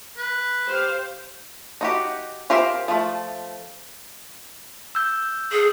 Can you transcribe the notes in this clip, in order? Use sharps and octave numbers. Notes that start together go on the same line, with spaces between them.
B4
G4 C5 F5
D#4 F#4 G4
F4 G4 A#4 C5 E5
F3 A3
E6 G6
G#4